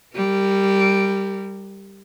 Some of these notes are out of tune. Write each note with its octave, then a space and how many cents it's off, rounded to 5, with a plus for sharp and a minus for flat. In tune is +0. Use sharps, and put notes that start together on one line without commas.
G3 +0 A#4 -30